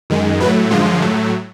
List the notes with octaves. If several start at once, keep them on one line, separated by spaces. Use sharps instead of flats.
F#2 D#3 G#3
A2 F#3 A3 B4
F#2 D3 F3 G#3 F4
A2 F#3 A3